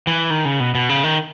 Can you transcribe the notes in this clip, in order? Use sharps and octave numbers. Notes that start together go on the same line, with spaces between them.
E3
D#3
C#3
B2
B2
C#3
D#3